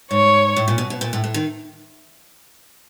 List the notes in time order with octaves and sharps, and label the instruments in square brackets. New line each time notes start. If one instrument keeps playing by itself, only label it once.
[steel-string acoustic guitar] G#2 [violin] C#5
[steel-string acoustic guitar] A2
A#2
B2
B2
A#2
A2
A2
D#3